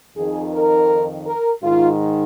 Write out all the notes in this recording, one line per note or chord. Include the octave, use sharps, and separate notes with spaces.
F2 D#3 G#4
A#4
A#4
G#2 D#3 F4